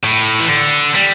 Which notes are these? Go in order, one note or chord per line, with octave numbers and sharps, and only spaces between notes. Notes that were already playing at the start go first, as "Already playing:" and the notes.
A2
E3
D3
G3